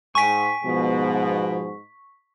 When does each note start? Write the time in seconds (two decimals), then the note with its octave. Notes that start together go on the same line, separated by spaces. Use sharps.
0.15 G#2 G5 G#5 C#6 B6
0.64 G#2 B2 F3